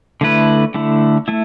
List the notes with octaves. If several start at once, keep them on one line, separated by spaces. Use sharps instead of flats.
D3 A3 E4 B4
D3 A3 E4
A3 E4